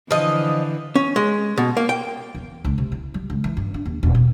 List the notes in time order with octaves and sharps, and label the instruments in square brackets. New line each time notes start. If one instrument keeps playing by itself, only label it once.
[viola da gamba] D3 E3 [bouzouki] F3 D#5
[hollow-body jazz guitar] C#4
G#3
B2
A#3
G5
[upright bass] E2
C#2
C3
E4
G3
C#2
E3
G2
D4
D#2
D#1
B2